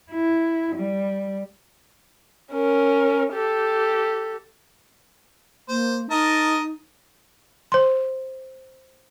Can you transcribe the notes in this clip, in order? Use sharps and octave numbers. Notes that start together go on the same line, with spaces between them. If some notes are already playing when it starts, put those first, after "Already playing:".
E4
G3
C#4 A#4
G4 A4
A#3 C5
D#4 A#4 D#5 A5
C5 C6